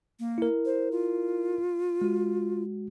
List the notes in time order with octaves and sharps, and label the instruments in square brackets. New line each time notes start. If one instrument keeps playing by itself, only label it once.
[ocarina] A#3
[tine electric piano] E4 A#4
[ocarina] C5
F4
[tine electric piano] G#3 F#4